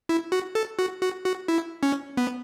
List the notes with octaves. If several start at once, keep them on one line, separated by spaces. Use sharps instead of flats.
E4
F#4
A4
F#4
F#4
F#4
E4
C#4
B3